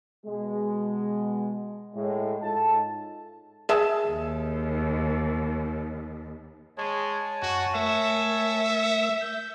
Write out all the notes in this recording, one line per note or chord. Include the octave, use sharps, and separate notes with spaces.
B2 G#3
A2 G#3
G#2 D#4 F4 A4 A5
G#4 E5 A5
D#2
G#3 C#5 G#5 A5
F#2 F#4
A3 A#4 E5
G6